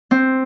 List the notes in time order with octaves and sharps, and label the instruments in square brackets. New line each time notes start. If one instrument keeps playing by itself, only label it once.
[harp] C4